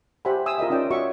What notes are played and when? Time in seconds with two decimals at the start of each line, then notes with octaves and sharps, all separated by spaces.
0.25 G4 C5 E5 F#5 G#5 B5
0.46 E5 G#5 D#6 E6
0.58 F4 A#4 D#5 E5
0.70 C#4 D#4 D5 G5
0.91 F#4 C#5 E5 C#6